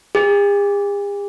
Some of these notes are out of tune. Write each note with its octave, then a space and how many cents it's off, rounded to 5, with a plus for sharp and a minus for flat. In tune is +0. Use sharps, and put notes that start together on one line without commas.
G#4 -45